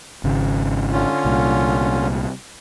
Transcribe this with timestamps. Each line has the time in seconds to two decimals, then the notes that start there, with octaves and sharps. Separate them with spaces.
0.24 G#1 C#3
0.92 D3 C#4 F4
1.25 C2 A#2